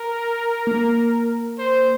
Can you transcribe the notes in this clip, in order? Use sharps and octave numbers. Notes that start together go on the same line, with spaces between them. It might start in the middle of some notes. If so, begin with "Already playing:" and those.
Already playing: A#4
A#3
C5